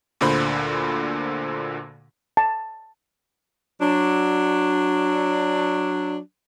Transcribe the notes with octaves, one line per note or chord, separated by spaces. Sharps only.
D2 A#2 D3 C5 B5
A5
F#3 D4